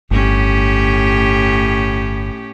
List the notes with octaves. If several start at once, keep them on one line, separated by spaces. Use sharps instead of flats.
G1 A2 C#4 G4